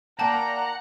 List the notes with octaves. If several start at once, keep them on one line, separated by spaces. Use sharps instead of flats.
A#3 D5 F#5 G5 A5 A#5